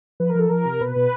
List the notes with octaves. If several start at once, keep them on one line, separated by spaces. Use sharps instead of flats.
F3 B4
A#4
F3 A4
F3 A#4
C3
B2 B4
B2